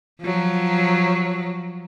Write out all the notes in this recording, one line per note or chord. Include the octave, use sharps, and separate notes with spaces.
F3 F#3